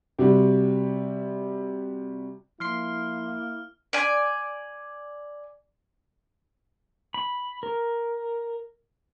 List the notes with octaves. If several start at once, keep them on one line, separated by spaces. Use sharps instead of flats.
C3 G3 F#4
F3 A#3 E4 C6 F6 C7
D5 G#5
B5
A#4